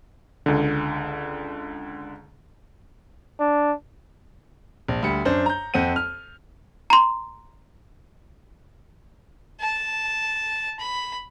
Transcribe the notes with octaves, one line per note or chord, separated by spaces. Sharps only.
C#2 D3
D4
A#1
D2 G3 B5 C#7
F#2 D4 C5
A#5 G6
F2 C4 F#5 D#7
F6
A#5 C6
A5
B5